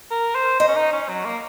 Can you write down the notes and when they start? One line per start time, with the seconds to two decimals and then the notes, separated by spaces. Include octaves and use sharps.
0.11 A#4
0.35 C5
0.60 C5 D#5
0.68 C#4
0.76 D#4
0.93 C#4
1.09 F#3
1.25 A#3